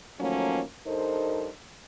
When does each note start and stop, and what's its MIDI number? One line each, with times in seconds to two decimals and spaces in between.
0.20 0.61 51
0.20 0.61 53
0.20 0.61 54
0.20 0.61 57
0.20 0.61 58
0.20 0.61 61
0.86 1.48 43
0.86 1.48 63
0.86 1.48 69
0.86 1.48 70
0.86 1.48 72